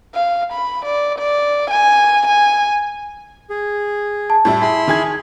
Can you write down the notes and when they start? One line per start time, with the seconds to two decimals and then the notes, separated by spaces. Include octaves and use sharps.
0.15 F5
0.53 B5
0.85 D5
1.19 D5
1.70 G#5
2.27 G#5
3.50 G#4
4.30 A5
4.45 A2 G3 E4
4.62 E4 G#4 B5 C6
4.88 D#3 G#4 G#6